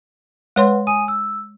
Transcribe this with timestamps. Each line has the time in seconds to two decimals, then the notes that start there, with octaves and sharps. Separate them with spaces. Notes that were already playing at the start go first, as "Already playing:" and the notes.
0.56 G#3 B4 C#5 F#5 C6
0.87 G#5 D#6 D#7
1.08 E6